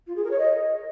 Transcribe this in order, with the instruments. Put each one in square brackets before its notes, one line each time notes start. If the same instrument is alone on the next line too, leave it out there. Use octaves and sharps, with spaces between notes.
[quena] F4
G#4
A#4
C#5
D#5